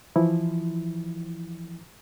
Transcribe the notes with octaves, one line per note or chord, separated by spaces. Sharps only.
E3 F3 E4